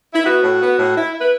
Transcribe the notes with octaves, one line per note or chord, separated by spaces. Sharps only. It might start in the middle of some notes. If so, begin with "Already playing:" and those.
E4
B3 F#4
A2
B3
A2
E4
E4
B4